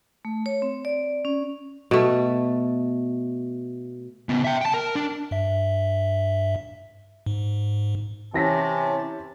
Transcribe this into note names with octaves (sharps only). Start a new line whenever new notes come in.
A3
C#5
C4
D5
C#4
B2 A3
C#3 B3
E5 G5
G5 A5
A#4
D4
G2 E5
G#2
C3 E3 C#4 A5 A#6 B6